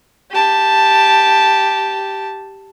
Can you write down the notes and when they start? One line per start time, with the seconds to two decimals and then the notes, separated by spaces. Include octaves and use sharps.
0.31 G4 A5